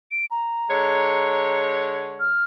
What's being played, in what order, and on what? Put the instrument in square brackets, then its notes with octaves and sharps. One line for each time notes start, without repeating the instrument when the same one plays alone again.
[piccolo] D7
A#5
[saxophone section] D3 G#3 C#5
[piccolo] F6